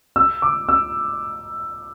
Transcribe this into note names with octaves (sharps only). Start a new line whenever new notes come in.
E6
D6
E6